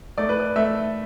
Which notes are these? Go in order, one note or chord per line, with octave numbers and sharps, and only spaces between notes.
A3 D5
B4
D5
A3 E5